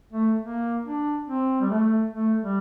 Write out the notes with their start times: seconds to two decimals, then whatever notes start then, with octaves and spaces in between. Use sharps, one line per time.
0.13 A3
0.42 A#3
0.85 D4
1.27 C4
1.61 G3
1.70 A3
2.14 A3
2.42 G3